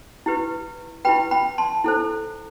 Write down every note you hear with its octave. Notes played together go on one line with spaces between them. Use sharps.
E4 G4 B4
E4 G4 B4 G5 B5
G5 B5
A5 C6
E4 A4 C5